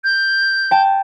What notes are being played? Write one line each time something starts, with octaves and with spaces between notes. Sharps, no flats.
G6
G5 A5